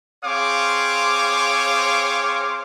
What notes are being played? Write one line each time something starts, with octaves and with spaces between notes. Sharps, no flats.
C4 G#4 C5 C#5 F5 D6